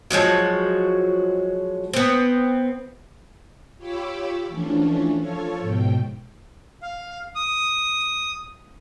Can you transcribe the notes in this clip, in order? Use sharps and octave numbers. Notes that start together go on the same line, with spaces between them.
F3 F#3 G#3 F#4
B3 C4
F4 G4 C#5 B5 D6 E6
E3 F3 A3 C#4 D4
F3 F4 A4 C#5
G#2 B2 G5
F5
D#6